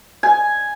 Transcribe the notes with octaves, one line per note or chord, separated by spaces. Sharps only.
G#5